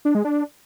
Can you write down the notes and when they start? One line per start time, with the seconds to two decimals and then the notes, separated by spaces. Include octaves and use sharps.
0.05 D4
0.15 G#3
0.25 D4